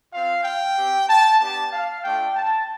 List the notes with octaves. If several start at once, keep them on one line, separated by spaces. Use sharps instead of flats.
C4 F4 F5
G5
C4 G4
A5
B3 D4 G4 A5
F5
A3 D4 F4 G5
A5